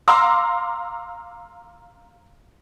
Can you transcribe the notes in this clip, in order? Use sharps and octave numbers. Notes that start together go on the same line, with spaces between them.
F5 A#5 C6 D6 E6